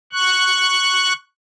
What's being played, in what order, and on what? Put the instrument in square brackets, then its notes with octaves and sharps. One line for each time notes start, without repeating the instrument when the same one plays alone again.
[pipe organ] C#6 F#6